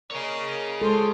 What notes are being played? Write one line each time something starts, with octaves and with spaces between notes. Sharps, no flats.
A#3 G#4 C#5 D#5
G#3 F4 A4 C5